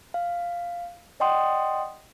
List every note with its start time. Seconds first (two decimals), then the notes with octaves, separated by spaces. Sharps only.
0.14 F5
1.20 D5 D#5 F#5 G5 C6 D#6